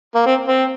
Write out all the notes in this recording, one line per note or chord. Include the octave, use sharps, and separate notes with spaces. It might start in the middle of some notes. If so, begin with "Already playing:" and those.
A#3
C4
C4